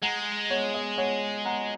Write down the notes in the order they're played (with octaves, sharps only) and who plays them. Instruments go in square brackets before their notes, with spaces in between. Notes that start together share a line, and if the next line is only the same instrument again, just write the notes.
[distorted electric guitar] G#3 [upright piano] F#5 A#5
[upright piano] C#5 F#5
D#5
C#5 F#5
F#5 A#5